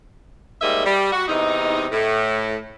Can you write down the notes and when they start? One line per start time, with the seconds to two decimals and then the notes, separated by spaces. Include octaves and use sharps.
0.62 G#2 G3 A#3 D#5 E5
0.86 G3
1.12 F#4
1.28 E2 C3 D#4
1.92 A2